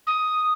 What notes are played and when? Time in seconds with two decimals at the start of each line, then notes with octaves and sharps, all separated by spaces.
0.06 D#6